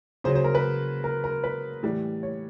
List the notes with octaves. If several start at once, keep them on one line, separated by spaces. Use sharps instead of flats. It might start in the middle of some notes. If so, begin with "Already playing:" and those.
C#3 F#3 C5
C5
A#4
B4
A#4
A#4
B4
A2 E3 G3
C#5